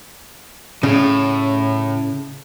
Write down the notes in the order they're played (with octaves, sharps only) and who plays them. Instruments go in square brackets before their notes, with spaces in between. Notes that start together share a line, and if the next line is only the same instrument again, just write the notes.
[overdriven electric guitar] A2 [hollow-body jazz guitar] C#3 C#4